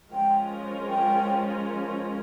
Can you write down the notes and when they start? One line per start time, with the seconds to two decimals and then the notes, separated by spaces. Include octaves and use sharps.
0.12 F3 G#3 C#4 F4 A#4 G5
0.88 G5